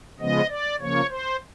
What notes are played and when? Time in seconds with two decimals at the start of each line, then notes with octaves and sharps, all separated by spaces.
0.20 C#3 F3 G#3 B3 D#5
0.49 D5
0.80 C#3 F3 A#3 C#5
1.10 C5